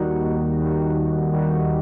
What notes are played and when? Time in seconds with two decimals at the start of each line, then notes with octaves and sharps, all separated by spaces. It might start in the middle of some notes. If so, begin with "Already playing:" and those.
Already playing: D#2 D#3 G3 D#4 F#4
0.23 D#2
0.58 D#3 G3 D#4 F#4
0.95 D#2
1.32 D#3 G3 D#4 F#4